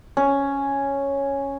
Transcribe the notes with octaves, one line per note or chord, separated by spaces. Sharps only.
C#4